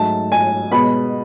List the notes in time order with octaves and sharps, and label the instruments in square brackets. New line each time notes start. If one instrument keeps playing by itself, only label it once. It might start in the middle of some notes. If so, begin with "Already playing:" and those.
Already playing: [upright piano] G#2 F#3 A3 A5
G#5
B2 G#3 B3 B5